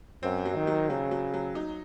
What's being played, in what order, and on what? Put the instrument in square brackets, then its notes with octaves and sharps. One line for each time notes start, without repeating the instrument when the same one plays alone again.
[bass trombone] F#2 [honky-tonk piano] C4
[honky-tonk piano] F#3
[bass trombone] D#3
[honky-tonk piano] F#3
[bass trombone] C#3 [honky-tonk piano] F#3
[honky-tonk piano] F#3
F#3
D#4